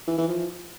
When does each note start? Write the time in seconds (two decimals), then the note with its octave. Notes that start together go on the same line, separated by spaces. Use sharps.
0.07 E3
0.18 E3
0.29 F3